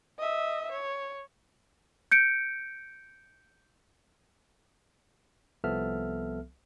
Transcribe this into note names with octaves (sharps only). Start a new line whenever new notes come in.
D#5 E5
C#5
G6 C#7 D7
C2 F3 B3 A4 E5 F6